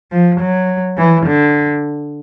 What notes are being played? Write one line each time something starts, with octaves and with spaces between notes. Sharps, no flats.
F3
F#3
E3
D3